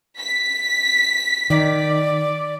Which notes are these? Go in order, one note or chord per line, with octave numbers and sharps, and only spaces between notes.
B6
D#3 D5